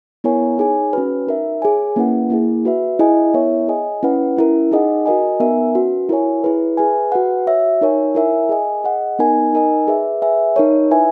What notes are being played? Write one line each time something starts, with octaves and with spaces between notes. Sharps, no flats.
B3 E4 A#4 C#5 G#5
D#4 G#4 C#5 G#5
C#4 F#4 B4
D#4 A#4 E5
G#4 C#5 G#5
A#3 C#4 E4 B4 F#5
A#3 E4 G#4
F#4 B4 E5
E4 G#4 D#5 G#5
B3 E4 A#4 C#5 E5
G#4 D#5 G#5
C#4 E4 B4 F#5
C#4 E4 A#4
D#4 G#4 D#5 F#5
F#4 A#4 D#5 G#5
B3 D#4 A#4 E5 G#5
C#4 F#4 B4
E4 A#4 C#5 G#5
E4 G#4 B4
G#4 B4 E5 G#5
F#4 B4 F#5
F#4 C#5 E5
D#4 A#4 C#5 G#5
E4 A#4 E5 G#5
G#4 D#5 G#5
G#4 D#5 F#5
B3 D#4 A#4 D#5 G#5
D#4 A#4 D#5 G#5
G#4 B4 E5
G#4 B4 E5 G#5
D#4 A#4 C#5
E4 B4 E5 G#5